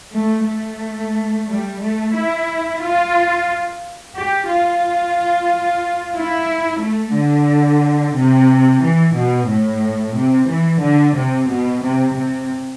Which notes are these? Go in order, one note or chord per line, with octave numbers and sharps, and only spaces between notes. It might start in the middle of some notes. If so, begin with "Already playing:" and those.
A3
A3
G3
A3
E4
F4
G4
F4
E4
A3
D3
C3
E3
B2
A2
C3
E3
D3
C3
B2
C3
C3